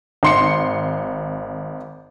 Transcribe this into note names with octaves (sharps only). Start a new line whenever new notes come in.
G#1 C6 C#7